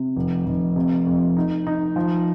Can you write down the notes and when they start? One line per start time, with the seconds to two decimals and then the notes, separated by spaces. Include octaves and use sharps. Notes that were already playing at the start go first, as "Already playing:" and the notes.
Already playing: C3
0.16 F1
0.46 F1
0.76 C3
1.06 F2
1.37 D#4
1.67 D#4
1.96 F3